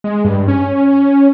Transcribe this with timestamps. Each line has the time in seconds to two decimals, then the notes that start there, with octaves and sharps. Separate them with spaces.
0.04 G#3
0.25 G2
0.48 C#4